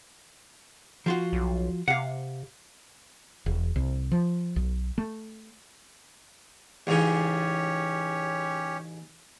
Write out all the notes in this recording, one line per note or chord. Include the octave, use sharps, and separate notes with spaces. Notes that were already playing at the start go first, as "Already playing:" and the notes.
F3 F4 F#4
B1
C3 F5 F#5
E1
C2
F3
B1
A3
A1 G#2 C#3 C#4 G4 C#5